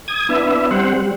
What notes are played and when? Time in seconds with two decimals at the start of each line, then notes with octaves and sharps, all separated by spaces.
0.08 D#6 G#6
0.29 B3 D4 E4 E5
0.71 G3 C4 C5 F#5
0.96 G3